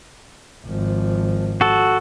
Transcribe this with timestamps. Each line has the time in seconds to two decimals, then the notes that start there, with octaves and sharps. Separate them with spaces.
0.66 G#1 F3
1.61 F#4 A4